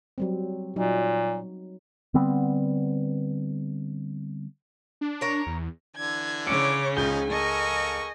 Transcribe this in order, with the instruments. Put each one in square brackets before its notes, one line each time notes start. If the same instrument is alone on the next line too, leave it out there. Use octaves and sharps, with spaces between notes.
[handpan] F#3 G3 C4
[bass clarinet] A#2 [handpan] F#3 D#4
[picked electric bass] D3 G3 B3 C4
[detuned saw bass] D4
[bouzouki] A#4 C#5
[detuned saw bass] E2
[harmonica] D3 E3 D4 [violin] G#6
[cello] C#3 C#4 [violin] C#5 D6 [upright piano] E6 C#7
[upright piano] C#2 G6 G7 [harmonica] F3 D#4 [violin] G#5
[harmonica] A4 A#4 C#6 [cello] D#5